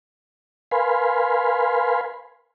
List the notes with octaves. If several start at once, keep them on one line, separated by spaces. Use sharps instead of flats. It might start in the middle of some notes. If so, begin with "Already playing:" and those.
A#4 B4 F5 G#5 B5 C6